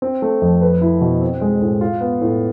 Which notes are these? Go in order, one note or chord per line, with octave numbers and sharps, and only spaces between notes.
C4
A3
F2
B4
E4
B2
C4
G#3
A2
F4
B3
A2